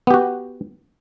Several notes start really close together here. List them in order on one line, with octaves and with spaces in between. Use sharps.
B3 G4 F#4